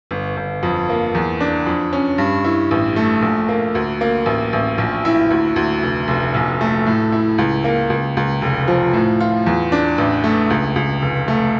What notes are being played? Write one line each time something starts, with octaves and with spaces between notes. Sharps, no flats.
G1
G1
F2
A#3
E2
D4
F2
C#4
G2
E4
A1
A3
A#1
A#3
D2
A#3
A1
A1
A#1
E4
D2
D2
F1
F1
A#1
A3
A2
E4
C#2
A#3
C#2
C#2
F1
F3
A2
F4
E2
D4
A1
A3
C#2
C#2
F1
A3